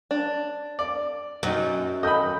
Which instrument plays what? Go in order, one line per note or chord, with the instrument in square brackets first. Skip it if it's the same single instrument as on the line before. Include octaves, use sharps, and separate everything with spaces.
[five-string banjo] D4
[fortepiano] D5
[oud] F#2 [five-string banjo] F#3 D#4
[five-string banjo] D#3 [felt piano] A4 G6 [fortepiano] D#5 B5